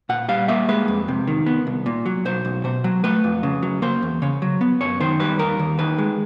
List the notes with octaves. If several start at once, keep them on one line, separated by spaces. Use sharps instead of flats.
A#2 F#5
G3 F5
A#3 E5
G#3 B4
F2
C3
D#3
B3
C2
A#2
F#3
B1 C5
B1
B2 C5
F#3
A3 B4
F2
C#3
F#3
A#3 C5
E2
C#3 C#5
F#3
B3
F#2 C#5
D#3 C5
G3 B4
D#2 A#4
D#2
D#3 B4
G#3